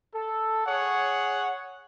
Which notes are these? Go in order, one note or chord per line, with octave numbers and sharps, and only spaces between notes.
A4
G#4 C#5 F#5